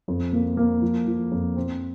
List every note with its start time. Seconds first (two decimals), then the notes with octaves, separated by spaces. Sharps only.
0.08 F2
0.33 A#3
0.57 A#3
0.82 F3
1.07 F3
1.31 F2
1.56 C4